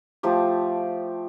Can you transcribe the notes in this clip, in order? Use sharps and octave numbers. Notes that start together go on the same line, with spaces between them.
F3 A3 G4